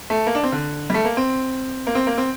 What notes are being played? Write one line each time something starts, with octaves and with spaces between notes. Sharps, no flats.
A3
A#3
D4
C4
D3
G3
A3
A#3
C4
A#3
C4
A#3
C4